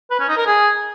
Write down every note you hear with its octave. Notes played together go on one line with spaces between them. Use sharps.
B4
C#4
D#4
A#4
G#4